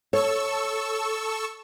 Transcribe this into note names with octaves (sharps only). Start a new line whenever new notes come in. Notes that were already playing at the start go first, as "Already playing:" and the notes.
A4 C#5 C#6 E6